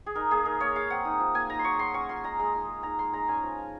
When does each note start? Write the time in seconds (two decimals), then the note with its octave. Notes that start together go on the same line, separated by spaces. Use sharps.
0.06 G#4
0.15 D#4 A#4
0.31 A#3 G#4
0.45 D#4 A#4
0.60 A#3 C#5
0.75 G#3 F5
0.90 C4 F#5
1.05 D#4
1.20 F3
1.34 A#3 G#5
1.50 D#4 A#5
1.59 C6
1.64 F#3 C#6
1.79 F#3 C6
1.94 C#4 C#6
2.09 F4 C6
2.24 G#3 A#5
2.39 G#3 C6
2.54 D#4
2.69 G#3
2.83 D#4 A#5
2.98 G#3 C6
3.13 G#3 A#5
3.28 C#4 G#5
3.43 F3
3.58 F3